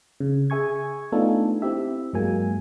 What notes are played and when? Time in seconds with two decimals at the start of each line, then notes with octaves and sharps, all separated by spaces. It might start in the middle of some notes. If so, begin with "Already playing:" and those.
0.20 C#3
0.50 G#4 E5 G#5 C#6 G#6
1.12 A3 B3 D4 D#4 F4 A4
1.62 C4 E4 G4 E5
2.13 G2 F#3 G#3 A#3 G#5